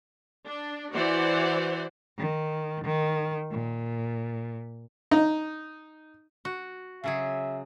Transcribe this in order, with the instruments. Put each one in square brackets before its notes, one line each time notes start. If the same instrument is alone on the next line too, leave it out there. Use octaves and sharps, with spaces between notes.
[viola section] D4
E3 F#4 C5 D5 F#5
[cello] D#3
D#3
A#2
[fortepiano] D#4
[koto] F#4
[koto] C#3 F#3 G#4 [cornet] E5